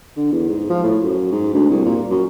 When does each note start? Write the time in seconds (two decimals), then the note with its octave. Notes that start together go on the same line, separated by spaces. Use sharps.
0.17 D3
0.32 E2
0.50 G#2
0.70 F3
0.84 A2
1.03 F#2
1.32 G#2
1.54 D2
1.69 C2
1.85 A#2
2.10 F#2